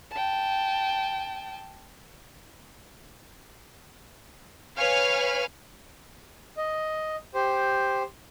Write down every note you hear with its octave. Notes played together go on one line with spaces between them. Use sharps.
G5 A5
B4 C#5 F5 G#5 F6
D#5
G4 C5